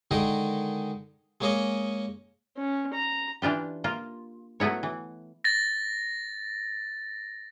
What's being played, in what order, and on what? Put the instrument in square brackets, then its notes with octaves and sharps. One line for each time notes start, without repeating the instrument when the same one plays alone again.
[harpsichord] D3 D#3 G#3 D#4 G#4 A#4
G#3 A#3 C#4 G#4 C#5 D#5
[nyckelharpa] C#4
A#5
[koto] E3 D4 F4 G4
A#3 F4
F#3 A3 B3 E4 C#5
E3
[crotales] A6 A#6